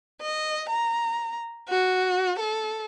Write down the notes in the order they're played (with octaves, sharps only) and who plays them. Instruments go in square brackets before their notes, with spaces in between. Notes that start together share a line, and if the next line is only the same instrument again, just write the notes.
[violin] D#5
A#5
F#4
A4